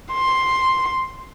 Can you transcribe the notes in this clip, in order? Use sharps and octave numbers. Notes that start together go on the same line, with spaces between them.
C6